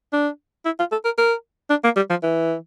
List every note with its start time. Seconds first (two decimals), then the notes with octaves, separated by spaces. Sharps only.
0.13 D4
0.65 E4
0.79 F4
0.92 A4
1.05 A#4
1.18 A#4
1.70 D4
1.84 A#3
1.96 G3
2.10 F3
2.23 E3